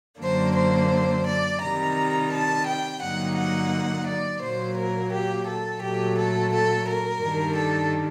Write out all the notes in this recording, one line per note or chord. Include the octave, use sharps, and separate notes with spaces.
F#2 D3 F#3 A#3 D4 C5
C5
D5
C3 D#3 G3 A#5
A5
G5
G2 D3 F#3 A#3 D#4 F#5
F#5
D5
A#2 F#3 A#3 C5
A#4
G4
A4
A#2 F#3 A3 G4
A4
A4
A#4
G2 D#3 G3 D4
A4